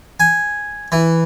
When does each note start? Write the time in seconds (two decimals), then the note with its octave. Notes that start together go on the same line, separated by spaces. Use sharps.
0.20 G#5
0.92 E3